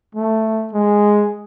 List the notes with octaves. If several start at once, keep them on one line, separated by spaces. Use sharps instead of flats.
A3
G#3